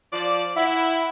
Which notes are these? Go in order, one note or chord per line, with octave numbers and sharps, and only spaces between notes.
F3 D5
E4 F#5